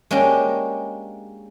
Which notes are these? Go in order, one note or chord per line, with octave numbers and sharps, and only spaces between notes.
G#3 A#3 C#4 D4 G4